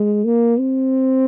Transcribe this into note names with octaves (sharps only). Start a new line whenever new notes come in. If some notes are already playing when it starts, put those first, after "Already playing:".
Already playing: G#3
A#3
C4